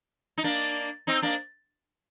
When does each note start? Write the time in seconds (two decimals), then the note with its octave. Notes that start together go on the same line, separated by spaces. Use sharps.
0.38 D#4
0.44 A#3 D4
1.07 C4 D#4
1.22 A#3 D4